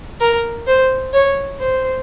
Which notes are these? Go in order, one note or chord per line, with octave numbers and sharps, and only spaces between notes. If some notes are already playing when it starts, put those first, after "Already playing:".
A#4
C5
C#5
C5